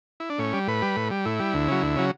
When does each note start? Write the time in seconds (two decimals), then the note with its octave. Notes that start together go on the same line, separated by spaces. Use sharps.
0.20 E4
0.30 D4
0.38 A2 C#4
0.53 G3
0.68 A2 B4
0.82 G3
0.96 A2
1.11 G3
1.26 A2 E4
1.40 G3
1.54 D2
1.68 C#3 F#3
1.82 D2
1.96 C#3 F#3